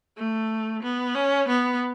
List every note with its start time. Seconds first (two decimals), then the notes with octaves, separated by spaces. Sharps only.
0.17 A3
0.83 B3
1.15 C#4
1.48 B3